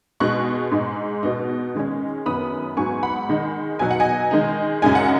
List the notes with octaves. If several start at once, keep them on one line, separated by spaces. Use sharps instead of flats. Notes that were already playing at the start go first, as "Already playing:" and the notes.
B2 G#3 D#4 C#6 F#6
G#2 G#3 D#4
B2 B3 D#4
D#3 G#3 C#4
F#2 D#3 B3 B5 D#6
G#2 F#3 B3 G#5 C#6
F#5 B5
D#3 G#3 D#4
B2 F#3 D#4 G#5
F#5
D#5 G#5
D#3 G#3 D#4
F#2 C#3 G#3 D#4 G#5
F#5